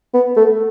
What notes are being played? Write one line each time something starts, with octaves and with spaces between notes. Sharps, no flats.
B3
A3